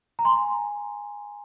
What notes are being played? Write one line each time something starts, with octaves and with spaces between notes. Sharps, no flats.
A#5
G#5 C6